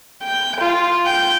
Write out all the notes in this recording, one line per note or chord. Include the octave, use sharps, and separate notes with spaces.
G5
F4
G5